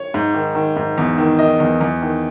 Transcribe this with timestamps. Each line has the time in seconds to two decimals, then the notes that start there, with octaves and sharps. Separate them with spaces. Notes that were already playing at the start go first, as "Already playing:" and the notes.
Already playing: C#5
0.14 G#2
0.34 D#3
0.55 D#3
0.77 G#2
0.98 E2
1.18 D#3
1.39 D#3 D#5
1.60 E2
1.81 E2
2.02 D#3